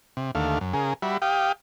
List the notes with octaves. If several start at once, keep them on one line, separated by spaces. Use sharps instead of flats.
C3
D#2 D3 A3 F5
F#2
C#3 G#4 A#4
G3 F#4 E5 B5
G4 F5 G5 D#6